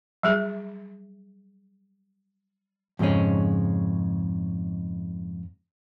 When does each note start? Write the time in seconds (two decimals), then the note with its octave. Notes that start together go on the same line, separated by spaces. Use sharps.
0.23 F#3 G3 G#4
2.99 F2 G#2 C#3 G#3 C#4